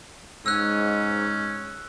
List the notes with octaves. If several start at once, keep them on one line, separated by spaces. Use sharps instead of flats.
G#2 C#4 E6 F#6